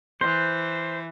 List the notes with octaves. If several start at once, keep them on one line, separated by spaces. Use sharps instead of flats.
E3 C5